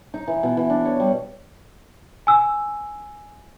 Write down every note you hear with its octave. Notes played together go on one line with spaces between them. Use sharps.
D#4
E3
B2
E3
D4
C#5
G3
G#5 E6